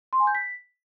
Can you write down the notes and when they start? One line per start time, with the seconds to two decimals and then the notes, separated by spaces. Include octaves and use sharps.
0.13 C6
0.20 G#5
0.27 G6
0.35 B6